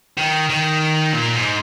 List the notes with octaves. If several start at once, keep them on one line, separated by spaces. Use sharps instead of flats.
D#3
D#3
A#2
G#2